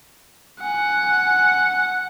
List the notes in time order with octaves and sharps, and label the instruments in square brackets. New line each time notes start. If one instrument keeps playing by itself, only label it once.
[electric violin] F#5 [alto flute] G#5